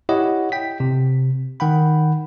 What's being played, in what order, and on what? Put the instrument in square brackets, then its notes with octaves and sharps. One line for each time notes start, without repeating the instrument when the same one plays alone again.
[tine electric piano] E4 G4 C#5 D#5 F#5
G5 B6
C3
D#3 F#5 G5 B5